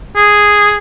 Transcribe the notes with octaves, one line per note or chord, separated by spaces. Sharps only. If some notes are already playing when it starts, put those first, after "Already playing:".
G#4